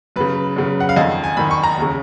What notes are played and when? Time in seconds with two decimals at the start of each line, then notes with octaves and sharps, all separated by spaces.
0.16 F#2 C#3 B4
0.56 F#2 C#3
0.80 F#5
0.89 F5
0.96 F2 D#5
1.00 D#3
1.24 G#5
1.37 F2 D#3 B5
1.51 C#6
1.64 A#5
1.77 D#2 C#3